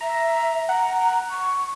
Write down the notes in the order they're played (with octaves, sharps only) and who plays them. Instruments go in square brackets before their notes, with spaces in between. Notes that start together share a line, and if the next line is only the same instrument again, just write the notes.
[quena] E5 [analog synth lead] A#5
[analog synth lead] F#5 [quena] A#5
[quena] C#6